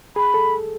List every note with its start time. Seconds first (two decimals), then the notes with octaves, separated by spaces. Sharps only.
0.16 G#4 B5
0.34 A4